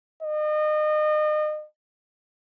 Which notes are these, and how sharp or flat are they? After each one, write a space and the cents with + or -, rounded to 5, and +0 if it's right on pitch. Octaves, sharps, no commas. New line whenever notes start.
D#5 -35